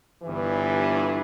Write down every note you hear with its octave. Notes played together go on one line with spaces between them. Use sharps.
G1 G2 E3